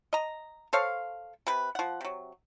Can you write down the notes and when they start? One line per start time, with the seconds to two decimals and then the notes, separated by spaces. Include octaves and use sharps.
0.13 D#5 A#5
0.73 A4 C5 C#5 F5
1.47 C3 B4
1.75 F3 F#5
2.01 C3 F#3